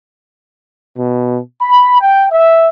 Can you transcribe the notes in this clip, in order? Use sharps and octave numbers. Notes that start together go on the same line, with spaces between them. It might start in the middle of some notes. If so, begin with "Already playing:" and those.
B2
B5
G5
E5